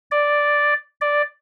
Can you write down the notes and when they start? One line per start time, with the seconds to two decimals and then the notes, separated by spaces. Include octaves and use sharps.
0.11 D5
1.01 D5